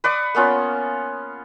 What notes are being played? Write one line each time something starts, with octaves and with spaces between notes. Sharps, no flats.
B4 D5 C#6 D#6
A#3 B3 C#4 F4